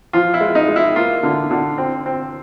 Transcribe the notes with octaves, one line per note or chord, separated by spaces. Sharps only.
F3 F4
E4
G#3
D#4
G#3
E4
A#3 F4
D3
D3
C4
C4